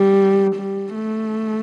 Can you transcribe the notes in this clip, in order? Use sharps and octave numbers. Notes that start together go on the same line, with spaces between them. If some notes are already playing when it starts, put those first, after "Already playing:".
Already playing: G3
G3
A3